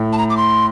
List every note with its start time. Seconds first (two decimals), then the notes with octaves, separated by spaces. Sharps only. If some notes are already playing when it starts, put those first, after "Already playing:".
Already playing: A2
0.13 A5
0.18 A#5
0.30 D6
0.37 C6